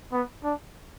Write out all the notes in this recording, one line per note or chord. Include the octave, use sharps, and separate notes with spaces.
B3
D4